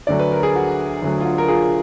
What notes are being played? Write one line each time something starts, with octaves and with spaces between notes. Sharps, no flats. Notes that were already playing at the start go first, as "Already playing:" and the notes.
D2 D3 F#3 D5
B4
A#4
G#4
F#4
D2 D3 F#3
F4
F#4
A#4
F4 G#4